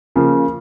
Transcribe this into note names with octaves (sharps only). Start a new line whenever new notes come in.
C#3 F3 A#3